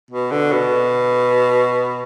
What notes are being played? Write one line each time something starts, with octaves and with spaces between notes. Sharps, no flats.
B2
D3
B2